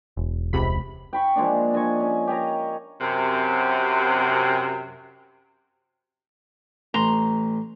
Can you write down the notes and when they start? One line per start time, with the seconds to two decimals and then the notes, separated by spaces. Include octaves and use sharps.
0.17 E1
0.53 C#2 C3 B5
1.13 G5 B5 C#6
1.36 F3 G#3 A#3 D4
1.73 D4 D#5 G#5 C#6
2.00 C#4
2.27 G4 C#5 D#5 A#5
3.01 F#2 C3
6.94 A1 A#5 C6